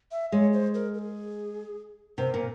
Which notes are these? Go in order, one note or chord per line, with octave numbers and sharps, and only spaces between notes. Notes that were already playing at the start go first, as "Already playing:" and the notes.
E5
G#3 C#5
C5
A#4
A#4
G#4
C3 A#4
A#2